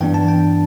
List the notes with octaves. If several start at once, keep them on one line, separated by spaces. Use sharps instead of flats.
G2 E3 B3 D4 G5
A5
G5